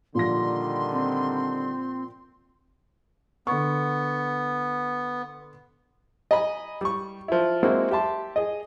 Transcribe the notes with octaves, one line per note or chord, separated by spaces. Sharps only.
A#2 D3 D#3 F3 G3 C6 A#6
C4
D3 B3 C#6
D#5 G#5 A#5 B5
G3 C#6
F3 E4
G#3 A#3 C4 E4 F#4
G4 E5 A5 C6
G#4 D#5